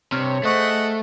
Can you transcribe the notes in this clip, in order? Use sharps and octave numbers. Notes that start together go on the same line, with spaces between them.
G2 C3 C#5 F6
A3 G#4 C5 D#5 F#5 C#6